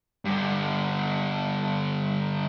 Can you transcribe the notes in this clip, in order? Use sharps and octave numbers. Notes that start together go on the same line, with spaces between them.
G2 D3